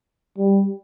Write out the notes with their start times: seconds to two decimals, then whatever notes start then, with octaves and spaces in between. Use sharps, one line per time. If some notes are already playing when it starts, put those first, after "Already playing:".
0.38 G3